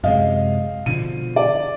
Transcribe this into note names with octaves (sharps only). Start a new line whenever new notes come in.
F#2 C3 G#3 D#5 F5
B2 D3 F3 D#7
D5